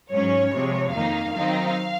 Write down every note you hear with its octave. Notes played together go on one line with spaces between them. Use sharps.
G#2 F#3 C#4 C#5
C3 F3 G#3
F2 D#3 A#3 D#4 F5
D#3 F#3 C4 D#4